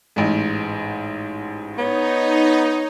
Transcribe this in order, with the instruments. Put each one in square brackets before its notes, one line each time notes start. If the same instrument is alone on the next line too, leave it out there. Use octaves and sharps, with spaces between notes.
[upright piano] A1 G#2
[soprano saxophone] B3 [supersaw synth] D#4 [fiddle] C#5